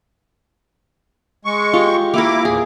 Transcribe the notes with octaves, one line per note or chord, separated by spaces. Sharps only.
G#3 C#6
F4 G4
A#3 E4 A#4 D6
E2 A#2 G#4